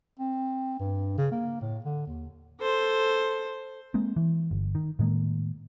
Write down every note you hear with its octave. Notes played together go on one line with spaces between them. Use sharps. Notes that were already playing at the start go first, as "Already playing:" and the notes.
C4
G2
C#3
A#3
A2
D3
D#2
A4 C5
G#3 A#3 C4
E3
G1
D#3
A2 D#3 G#3 A#3